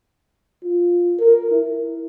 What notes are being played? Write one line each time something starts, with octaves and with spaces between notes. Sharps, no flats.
F4
A#4
E4